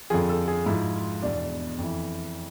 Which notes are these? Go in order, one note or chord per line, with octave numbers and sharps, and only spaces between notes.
F2 D3 F3 G#4
A4
G#4
G#2 F3 E4
F4
E2 B2 D4
F2 E3